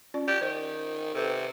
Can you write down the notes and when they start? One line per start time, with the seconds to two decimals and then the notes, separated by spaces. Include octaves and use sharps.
0.14 C#4 F4 D5
0.28 G4 D5
0.41 D#3 C5
1.14 C3 A4 B4